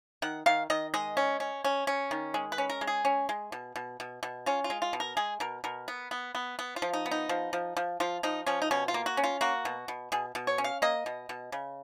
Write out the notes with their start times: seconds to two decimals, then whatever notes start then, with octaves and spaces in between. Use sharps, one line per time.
0.22 D#3 F#5
0.46 D#3 F5
0.70 D#3 D#5
0.94 G#3 D#5
1.17 C#4
1.40 C#4
1.64 C#4
1.87 C#4
2.11 D#3
2.34 G#3
2.52 B4
2.58 C#4
2.70 A#4
2.81 G#3
2.87 G#4
3.05 C#4
3.29 G#3
3.52 B2
3.76 B2
4.00 B2
4.23 B2
4.46 C#4 F4
4.64 F4
4.70 G#3
4.82 F4
4.93 B2
5.00 A#4
5.17 G#3 G#4
5.40 B2 A#4
5.64 B2 A#4
5.88 B3
6.11 B3
6.35 B3
6.59 B3
6.76 F4
6.82 F3
6.93 D#4
7.06 B3
7.11 D#4
7.29 F3
7.53 F3
7.77 F3
8.00 F3 F4
8.23 F3 D#4
8.46 F3 C#4
8.62 D#4
8.71 B2 C#4
8.88 F4
8.94 A#3
9.06 F#4
9.17 C#4
9.24 F4
9.41 A#3 F#4
9.65 B2
9.88 B2
10.12 B2 G#4
10.35 B2
10.47 C#5
10.58 C#4
10.64 F5
10.82 A#3 D#5
11.06 B2
11.29 B2
11.52 C#3